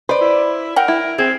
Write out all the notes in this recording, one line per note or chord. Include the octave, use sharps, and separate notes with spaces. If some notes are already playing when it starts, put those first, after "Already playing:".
B4 C5 D5
E4
A#4 F#5 G5
E4
C4 G#4